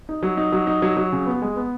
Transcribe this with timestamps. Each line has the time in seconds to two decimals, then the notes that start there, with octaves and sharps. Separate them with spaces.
0.09 D#4
0.23 F#3
0.37 D#4
0.52 F#3
0.67 D#4
0.82 F#3
0.97 F#3
1.12 C#3
1.26 B3
1.42 G#3
1.56 B3